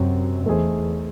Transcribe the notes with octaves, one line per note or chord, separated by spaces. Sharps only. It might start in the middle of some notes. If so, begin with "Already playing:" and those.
Already playing: F#2 C3 F#3 C4
E2 A3 D#4 G#4 C5